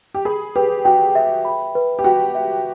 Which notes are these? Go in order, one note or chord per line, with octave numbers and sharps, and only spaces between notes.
G4
G#4 B5
G4 B4
F#4 G5
E5
B5
B4
G4
F#4 G5
E5